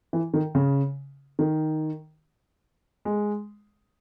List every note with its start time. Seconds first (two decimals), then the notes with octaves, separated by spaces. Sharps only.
0.13 E3
0.34 D#3
0.55 C#3
1.39 D#3
3.05 G#3